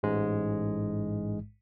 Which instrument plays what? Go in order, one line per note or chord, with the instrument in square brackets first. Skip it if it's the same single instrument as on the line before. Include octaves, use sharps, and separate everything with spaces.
[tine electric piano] A1 G#2 G#3